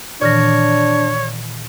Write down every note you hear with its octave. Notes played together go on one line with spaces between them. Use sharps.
A#2 D#3 E3 D4 C#5 D5 F6 A#6